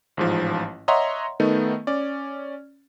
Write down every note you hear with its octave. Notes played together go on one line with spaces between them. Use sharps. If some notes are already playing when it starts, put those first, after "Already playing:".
A1 G#2 F3
C#5 D#5 E5 F#5 A#5 C6
D#3 A3 B3 D#4
C#4 D5